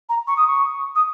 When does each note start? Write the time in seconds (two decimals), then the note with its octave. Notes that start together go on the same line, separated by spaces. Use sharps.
0.09 A#5
0.27 C#6
0.36 D#6
0.47 C#6
0.95 D#6